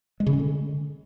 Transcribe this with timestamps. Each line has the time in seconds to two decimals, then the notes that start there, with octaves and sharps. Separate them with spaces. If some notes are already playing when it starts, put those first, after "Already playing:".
0.20 G#3
0.27 C#3
0.33 C#4
0.39 D3